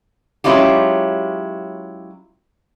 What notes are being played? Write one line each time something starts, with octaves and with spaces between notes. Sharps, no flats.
F#3 G#3 C#4 E4 F4 G4